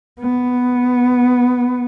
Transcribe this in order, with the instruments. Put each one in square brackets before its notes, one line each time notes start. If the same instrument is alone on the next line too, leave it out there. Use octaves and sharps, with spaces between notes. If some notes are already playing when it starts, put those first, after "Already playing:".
[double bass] B3